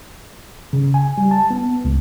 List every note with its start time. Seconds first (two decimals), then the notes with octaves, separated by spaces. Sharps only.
0.73 C#3
0.94 G#5
1.18 G3
1.31 A5
1.51 B3
1.85 C#2